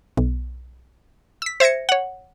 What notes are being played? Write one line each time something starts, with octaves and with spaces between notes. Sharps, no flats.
B1
E6 B6
C5 E5 G#6 A#6 C#7
C#5 F#5